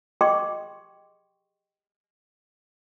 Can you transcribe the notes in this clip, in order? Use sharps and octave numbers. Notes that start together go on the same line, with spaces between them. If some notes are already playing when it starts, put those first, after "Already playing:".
G4 G#4 D#5 G5 C6 C#6